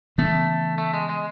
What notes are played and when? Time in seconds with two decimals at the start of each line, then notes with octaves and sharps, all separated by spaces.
0.18 C#3 E3 A3 B3
0.78 A3
0.94 G#3
1.09 G#3